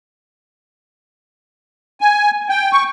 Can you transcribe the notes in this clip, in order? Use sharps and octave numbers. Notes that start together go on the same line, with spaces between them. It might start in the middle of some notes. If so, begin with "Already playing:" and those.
G#5
G5
C#6